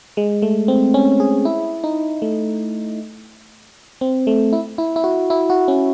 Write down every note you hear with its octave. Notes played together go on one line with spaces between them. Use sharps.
G#3
A3
C4
C#4
G#4
E4
D#4
A3
C4
A3
E4
E4
E4
F#4
E4
F#4
C#4